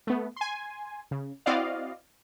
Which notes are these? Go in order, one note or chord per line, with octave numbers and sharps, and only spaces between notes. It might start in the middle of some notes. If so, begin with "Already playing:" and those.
A3 B3
G#5 C6
C#3
C4 E4 F#4 D5 D#5 F5